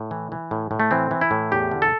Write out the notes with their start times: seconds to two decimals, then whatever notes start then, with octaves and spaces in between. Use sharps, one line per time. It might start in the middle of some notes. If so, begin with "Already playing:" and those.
Already playing: A2
0.11 E3
0.32 E3
0.51 A2
0.71 A2
0.80 A3
0.91 E3 C4
1.11 E3
1.21 E4
1.31 A2
1.52 E2 G4
1.72 D3
1.82 A4